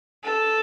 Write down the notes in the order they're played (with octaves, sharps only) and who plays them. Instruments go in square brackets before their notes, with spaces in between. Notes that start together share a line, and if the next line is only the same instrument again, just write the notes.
[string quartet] A4